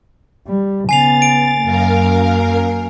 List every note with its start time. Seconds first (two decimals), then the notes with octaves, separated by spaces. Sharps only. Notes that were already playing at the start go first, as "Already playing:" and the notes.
0.47 G3
0.89 C#3 B3 G#5 A6 C7 F7
1.22 D7
1.62 F#2 A#3 A#4 F5